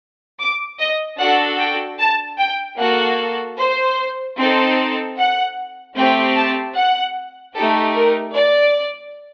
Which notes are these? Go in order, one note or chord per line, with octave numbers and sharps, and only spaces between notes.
D6
D#5
D4 F#4 A4 F#5
G5
A5
G5
A#3 F#4 A4 F#5
C5
C4 D#4 A4
F#5
A3 C4 G4 G5
A5
F#5
A3 D#4 G4 A4
A#4
D5